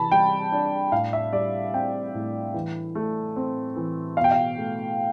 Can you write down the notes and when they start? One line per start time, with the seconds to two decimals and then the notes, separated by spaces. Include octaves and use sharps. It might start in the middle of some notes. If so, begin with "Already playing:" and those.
Already playing: C3 E3 A5 B5
0.12 G3 G5
0.52 D4
0.92 A2 F5
1.13 E5
1.33 G3 D5
1.73 C4 G5
2.14 A2
2.54 E3
2.95 A3
3.36 C4
3.76 E3
4.17 B2 F5
4.24 G5
4.31 F5
4.57 A3